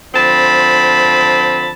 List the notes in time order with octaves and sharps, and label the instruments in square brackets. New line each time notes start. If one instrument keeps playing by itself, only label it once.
[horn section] D3 F3 C4 A5 B5